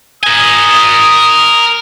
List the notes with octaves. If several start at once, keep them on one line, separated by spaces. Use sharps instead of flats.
A#4 G#5 D#6